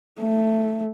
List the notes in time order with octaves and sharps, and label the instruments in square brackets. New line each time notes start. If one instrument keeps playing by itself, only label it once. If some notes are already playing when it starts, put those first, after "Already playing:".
[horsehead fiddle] A3